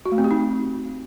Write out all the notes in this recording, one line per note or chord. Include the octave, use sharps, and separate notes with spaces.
F#4
A3
C4
G4
D#4